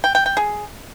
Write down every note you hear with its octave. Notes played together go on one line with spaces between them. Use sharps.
G5
G5
G5
G#4